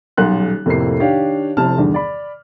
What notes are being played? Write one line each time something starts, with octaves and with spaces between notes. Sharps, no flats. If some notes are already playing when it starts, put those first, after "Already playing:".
D#1 B1 F#5 C6 F#6
F2 A2 C3 A#3 E4 C7
D#3 D4 G4 C#5 F5
F1 C3 E4 A4 A5 F6
E2 G2 D3 D#3
D5 B5